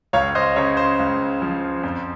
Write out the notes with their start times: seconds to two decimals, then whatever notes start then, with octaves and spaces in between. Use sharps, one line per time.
0.13 C#2 C#5 F5
0.35 C5 D#5
0.56 C#3 C#5
0.77 C5
0.99 C#2
1.42 F3
1.83 F2